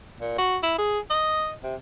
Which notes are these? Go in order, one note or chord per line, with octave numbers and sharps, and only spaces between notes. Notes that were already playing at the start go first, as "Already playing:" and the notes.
A#2
F#4
E4
G#4
D#5
C3